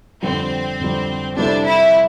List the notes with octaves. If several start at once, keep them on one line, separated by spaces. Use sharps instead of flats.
F2 D3 G3 C4
F2 D3 G3
C3 G3 C4 D4 E4 A4
E4